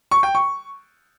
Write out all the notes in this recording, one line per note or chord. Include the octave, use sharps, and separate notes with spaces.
C#6
G5
C#6